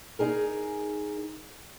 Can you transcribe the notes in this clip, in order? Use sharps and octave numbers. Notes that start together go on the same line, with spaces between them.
D#4 G#4 A#4